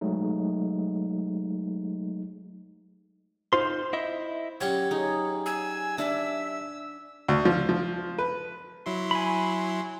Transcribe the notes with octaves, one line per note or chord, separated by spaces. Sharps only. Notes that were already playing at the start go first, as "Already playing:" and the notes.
F#3 G#3 A3 D#4
D#4 F4 C5 C6
E4 D#5 E5
F#3 G3 C#4 C#5
D#4 G#4
G#5 E6
D4 E5
D2
F3
F3
B4
F#3 E4 C6
G#5 B5